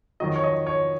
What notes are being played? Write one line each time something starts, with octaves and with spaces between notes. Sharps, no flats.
F2 D#3 F#3 D#5
C#5
D#5
C#5